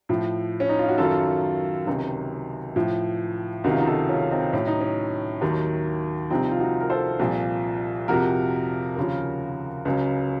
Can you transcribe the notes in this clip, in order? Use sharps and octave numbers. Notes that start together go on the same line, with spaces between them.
A2 F3
C#4
D#4
F4
F#4
F#2 D#3 F#3 F4 A4
C#2 C3 D#3 F#3
A2 F3
C#2 C3 D#3 F#3 F#4
F4
D#4 F#4
F4 A4
C#4 F4
C4 D#4
A2 F#3 C#4
D#4
C#4
D#2 D#3 F#3
C2 C3 F3 C4 D#4
F4
D#4 F#4
A#4
A4 C5
C2 A#2 F3
F2 C3 F3 F#4 A#4
D#2 C#3 F3
C#2 C#3 F#3